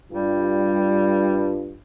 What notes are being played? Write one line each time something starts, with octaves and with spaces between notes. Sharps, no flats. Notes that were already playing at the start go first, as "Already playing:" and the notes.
G2 G3 F4